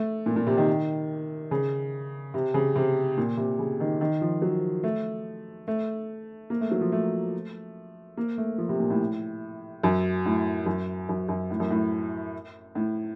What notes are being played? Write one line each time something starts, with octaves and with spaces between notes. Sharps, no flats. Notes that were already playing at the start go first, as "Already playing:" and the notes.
Already playing: A3
A#2
A#2
C3
D#3
C#3
C3
C#3
C3
A#2
C3
C#3
D#3
D#3
F3
F#3
A3
A3
A#3
A3
F#3
F3
A3
A#3
A3
F3
C3
A#2
A2
F#2
A2
F#2
F#2
F#2
A2
F#2
A2
A2